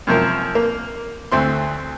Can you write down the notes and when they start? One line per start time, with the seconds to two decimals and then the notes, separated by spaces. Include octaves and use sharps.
0.07 F#2 C3 F3 A#4
0.55 A#3
1.32 D2 A3 C4 C6